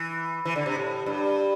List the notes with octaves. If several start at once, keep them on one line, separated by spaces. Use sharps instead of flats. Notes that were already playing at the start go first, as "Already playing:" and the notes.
Already playing: E3
E3
D3
C3
A2
G2